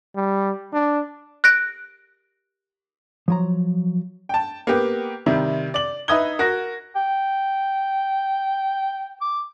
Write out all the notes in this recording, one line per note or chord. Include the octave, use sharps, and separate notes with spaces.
G3
D4
F#6 A#6 D7
F3 F#3 A#5
G5 A5
A#3 B3 G4
C3 D#3 G3 E4
D5 F#7
D#4 B4 E5 D#6 G#6 G7
F#4 A#4 A#6
G5
D6